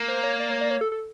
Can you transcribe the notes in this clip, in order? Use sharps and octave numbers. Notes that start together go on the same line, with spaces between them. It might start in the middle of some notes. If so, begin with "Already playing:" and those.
Already playing: A#3
C5
C#5
D5
C#5
D5
C#5
A4
A4